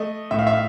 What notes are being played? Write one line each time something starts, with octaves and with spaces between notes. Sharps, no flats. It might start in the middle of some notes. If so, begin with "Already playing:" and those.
Already playing: A3 D#5
A2 E5
F5
E5
F5